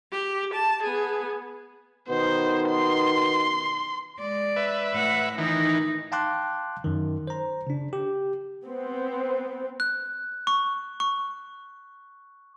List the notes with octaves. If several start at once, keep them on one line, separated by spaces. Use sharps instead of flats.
G4
A5
B3 G#4
B2 D#3 B3 C5
C6
G#3 D5
B4 E5
A2 F#5
D#3 E3 D#4
F5 G5 A5 C6 D6 F#6
F#2 D#3
C5 A#5
C#3 D4
G4
B3 C4
F#6
C#6
C#6